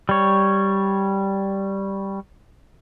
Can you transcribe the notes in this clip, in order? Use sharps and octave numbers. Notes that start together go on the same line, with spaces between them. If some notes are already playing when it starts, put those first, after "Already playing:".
G3 C#5